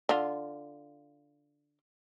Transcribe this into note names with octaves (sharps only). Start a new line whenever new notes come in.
D3 F4